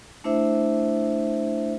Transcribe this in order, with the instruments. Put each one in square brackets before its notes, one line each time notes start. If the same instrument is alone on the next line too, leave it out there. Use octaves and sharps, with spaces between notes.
[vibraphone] A3 D4 E4 C5 E5